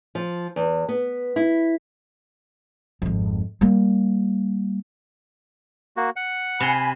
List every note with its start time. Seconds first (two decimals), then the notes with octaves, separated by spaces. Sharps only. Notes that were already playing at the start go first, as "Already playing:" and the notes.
0.15 F3
0.56 E2
0.89 B3
1.36 E4
3.02 G#1 F2
3.61 G3 A#3
5.97 A#3 F#4
6.16 F#5
6.60 C3 G#5 B5 C6